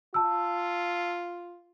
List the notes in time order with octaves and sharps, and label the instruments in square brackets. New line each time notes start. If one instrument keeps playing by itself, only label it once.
[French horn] F4 [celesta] A5 E6